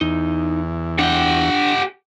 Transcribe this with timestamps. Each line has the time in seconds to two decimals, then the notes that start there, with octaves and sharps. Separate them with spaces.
0.01 E2 D#4
0.99 D4 G4 F#5 G5